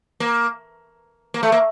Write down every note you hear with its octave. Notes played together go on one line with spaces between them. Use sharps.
A#3
A#3
A3
A#3